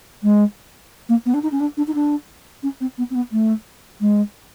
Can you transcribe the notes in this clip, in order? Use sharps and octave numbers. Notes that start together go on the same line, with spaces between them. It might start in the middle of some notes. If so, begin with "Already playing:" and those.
G#3
A#3
B3
D4
D#4
C#4
D4
D4
D#4
D4
C#4
C4
B3
C4
B3
A3
G#3